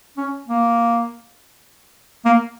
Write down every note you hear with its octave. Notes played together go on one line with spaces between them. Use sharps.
C#4
A#3
A#3